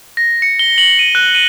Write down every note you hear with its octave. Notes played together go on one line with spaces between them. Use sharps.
A#6
C#7
G7
F#7
D#7
F#6
D#7